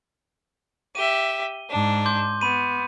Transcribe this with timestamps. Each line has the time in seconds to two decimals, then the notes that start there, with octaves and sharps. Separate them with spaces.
0.95 G4 E5 D#7 G7
1.69 G#2 D4
2.05 C6 D6 G6
2.41 B3 B5 D#7